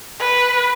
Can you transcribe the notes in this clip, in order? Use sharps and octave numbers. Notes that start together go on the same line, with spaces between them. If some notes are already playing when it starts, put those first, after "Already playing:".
B4